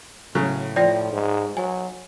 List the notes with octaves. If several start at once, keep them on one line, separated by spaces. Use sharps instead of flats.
A2 C#3 F#3
F3 D5 G5 A#6
G#2
F#3 G#5